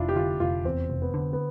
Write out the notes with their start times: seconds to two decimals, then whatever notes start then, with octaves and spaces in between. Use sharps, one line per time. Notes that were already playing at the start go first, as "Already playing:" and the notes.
Already playing: F1 D4 E4 F4
0.09 G4
0.15 D3 F4
0.40 F1 F4
0.65 E2 C4
0.90 F1
1.02 B3
1.14 D3
1.33 B3